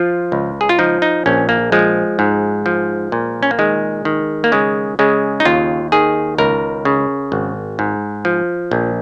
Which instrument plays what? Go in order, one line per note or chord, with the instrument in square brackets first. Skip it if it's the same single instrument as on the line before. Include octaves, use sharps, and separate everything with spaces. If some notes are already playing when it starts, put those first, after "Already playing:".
Already playing: [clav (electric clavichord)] F3 F4
C#2
G#4
F4
F3 D#4
D#4
A#1 C#4
A#3
F3 G#3
G#2
F3
A#2
C#4
A#3
D#3 G#3
D#3
A#3
C#3 G#3
C#3 G#3
D#4
D#2 F4
D#3 G#4
C#2 A#4
C#3
G#1
G#2
F3
A#1